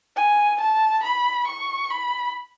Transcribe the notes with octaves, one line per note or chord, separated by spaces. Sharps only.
G#5
A5
B5
C#6
B5